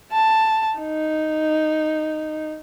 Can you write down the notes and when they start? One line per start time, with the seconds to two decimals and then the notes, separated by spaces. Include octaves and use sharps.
0.12 A5
0.79 D#4